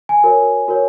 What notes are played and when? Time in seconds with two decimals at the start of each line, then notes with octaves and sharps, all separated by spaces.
0.09 G#5
0.23 F#4 A#4 C#5
0.68 F#4 A#4 C#5